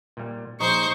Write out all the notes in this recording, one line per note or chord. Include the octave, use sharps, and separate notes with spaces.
A#2 G3
A#1 D#4 C5 C#6